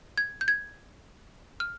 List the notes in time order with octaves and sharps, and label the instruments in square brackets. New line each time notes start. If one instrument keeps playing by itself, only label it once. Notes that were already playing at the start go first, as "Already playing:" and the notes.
[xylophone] G#6
G6
G#6
F6